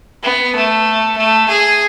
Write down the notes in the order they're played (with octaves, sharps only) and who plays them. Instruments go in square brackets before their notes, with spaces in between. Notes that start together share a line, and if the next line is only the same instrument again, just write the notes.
[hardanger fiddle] B3
A3
A3
G#4